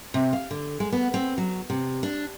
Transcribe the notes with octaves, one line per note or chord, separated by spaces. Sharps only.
C3
F5
D3
G#3
B3
C4
F#3
C3
D4